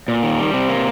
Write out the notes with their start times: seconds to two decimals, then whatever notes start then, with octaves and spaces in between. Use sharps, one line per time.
0.08 A#2
0.23 D#3
0.38 G3
0.54 C3
0.69 A#3